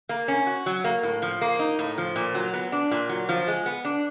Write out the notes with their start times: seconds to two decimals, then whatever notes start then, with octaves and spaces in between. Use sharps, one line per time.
0.09 A#3
0.28 C#4
0.46 F#4
0.66 F#3
0.84 A#3
1.03 A2
1.22 F3
1.41 A#3
1.59 D#4
1.79 A2
1.98 F3
2.16 A#2
2.34 F#3
2.54 B3
2.72 D4
2.91 A#2
3.09 F#3
3.29 F3
3.48 G#3
3.66 B3
3.85 D4